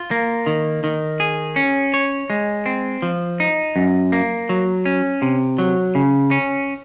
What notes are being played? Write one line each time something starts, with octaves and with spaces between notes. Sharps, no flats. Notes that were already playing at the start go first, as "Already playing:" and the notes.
Already playing: F4
A#3
D#3
D#3
G#4
C#4
C#5
G#3
C4
F3
D#4
F#2
A#3
F#3
C#4
C3
F#3
C#3
C#4